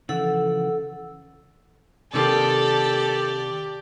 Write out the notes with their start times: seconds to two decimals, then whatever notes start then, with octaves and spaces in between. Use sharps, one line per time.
0.09 C#3 E3 F3 A4 F#5 E6
2.14 C3 D#3 A#3 G4 A4 D5